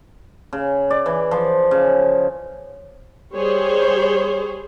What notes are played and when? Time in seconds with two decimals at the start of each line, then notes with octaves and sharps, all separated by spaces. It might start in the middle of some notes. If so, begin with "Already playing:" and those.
0.53 C#3
0.90 D5
1.06 E3
1.31 F3
1.71 C#3
3.34 G3 G#4 C5 C#5